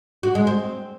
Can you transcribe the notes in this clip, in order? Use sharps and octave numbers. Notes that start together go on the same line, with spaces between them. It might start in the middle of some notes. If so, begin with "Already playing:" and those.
F#4
G#3
C4